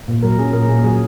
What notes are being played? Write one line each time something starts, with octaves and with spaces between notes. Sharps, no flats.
A#2
F#3 A#4
C#4 G#4
A#2 A#4
A#2 G#4
F#3 G#4